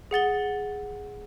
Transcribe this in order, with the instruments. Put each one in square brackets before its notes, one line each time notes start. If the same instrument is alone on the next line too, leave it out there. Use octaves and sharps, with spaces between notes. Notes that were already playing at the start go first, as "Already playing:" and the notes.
[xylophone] G#4 F#5 A6 G7